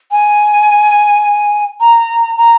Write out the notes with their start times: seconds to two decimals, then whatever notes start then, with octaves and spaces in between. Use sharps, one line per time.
0.11 G#5
1.80 A#5
2.38 A#5